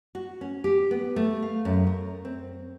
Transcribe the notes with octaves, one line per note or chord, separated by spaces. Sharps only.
F#4
C#4
G4
B3
A3
F5
F#2
A#4
C4